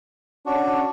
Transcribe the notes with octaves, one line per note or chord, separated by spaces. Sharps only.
C#4 D4 F#4